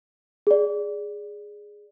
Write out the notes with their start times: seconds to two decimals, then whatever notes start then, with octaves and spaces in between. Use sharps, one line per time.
0.47 G#4 D5